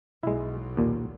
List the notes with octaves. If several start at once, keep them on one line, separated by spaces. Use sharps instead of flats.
B1 G#3 E4
D#2 A#2